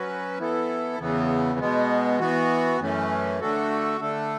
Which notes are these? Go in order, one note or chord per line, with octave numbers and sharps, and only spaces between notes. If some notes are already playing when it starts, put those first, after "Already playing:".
Already playing: F#3 C#4 F#4 B4
E3 B3 E4 A4
E2 C#3 E3 B3
B2 G#3 B3
E3 B3 F#4
F#2 E3 A3 C#4
D3 A3 D4 F#4 A4
D3 A3 D4 A4